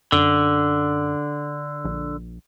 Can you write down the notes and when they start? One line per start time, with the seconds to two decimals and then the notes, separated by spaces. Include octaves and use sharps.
0.12 F#2 D3
1.85 A#1